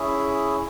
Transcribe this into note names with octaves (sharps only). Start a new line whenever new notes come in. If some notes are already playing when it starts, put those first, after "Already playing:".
Already playing: C#4 E4 G#4